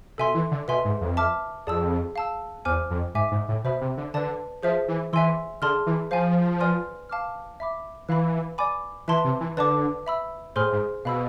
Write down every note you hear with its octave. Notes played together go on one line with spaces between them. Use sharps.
B2 A4 E5 G#5 C6
E3
D3
B2 B4 E5 G#5 C6
G#2
F2
E5 A5 D6 F6
F2 G#4 D5 A5 E6
F5 A5 E6
E2 C5 G#5 D6 F6
F2
G#2 E5 G#5 D6
G#2
A2
B2 C5 E5 B5
C3
D3
D3 B4 D5 A5
F3 G#4 C5 E5
E3
E3 E5 G#5 C6 E6
D3 G#4 D5 A5 C6 F6
E3
F3 C5 F5 G#5
B4 D5 G#5 C6 F6
F5 A5 D6 F6
E5 B5 D6
E3 B4 F5 B5
D5 G#5 B5 D6
E3 B4 E5 A5 C6
C3
E3
D3 B4 D5 A5 D6
E5 B5 E6
A2 G#4 C5 G#5 C6 F6
G#2
B2 F5 B5 E6